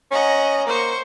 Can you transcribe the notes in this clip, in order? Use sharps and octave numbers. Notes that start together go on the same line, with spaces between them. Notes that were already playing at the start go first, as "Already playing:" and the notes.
C#4 D#5 F#5 A#5
A#3 C5 C#6